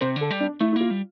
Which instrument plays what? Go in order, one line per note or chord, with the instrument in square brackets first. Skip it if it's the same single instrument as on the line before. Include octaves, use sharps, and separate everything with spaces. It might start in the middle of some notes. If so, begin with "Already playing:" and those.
[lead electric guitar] C3 [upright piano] C5
[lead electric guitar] D3
[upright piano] A4
[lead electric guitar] G3
[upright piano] D4
[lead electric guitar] A3 [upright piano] E4
[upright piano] E4
[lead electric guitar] A#3 [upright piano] F4
[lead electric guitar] G3